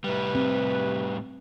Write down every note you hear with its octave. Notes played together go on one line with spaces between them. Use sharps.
A2 C3 G3 B4
C4